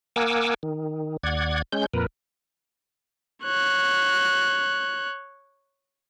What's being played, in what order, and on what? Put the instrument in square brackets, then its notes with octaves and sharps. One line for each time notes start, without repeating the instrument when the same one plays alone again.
[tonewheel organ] A#3 A#4 F#5 G#5 D6 E6
D#3
D#2 D5 F#5 G#6
G#3 C#4 G6
F2 A#2 A#4 B4
[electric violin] C#5 F#6